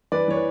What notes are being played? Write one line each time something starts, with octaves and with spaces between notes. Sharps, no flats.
E3 B4 D5
E3 C#5
B4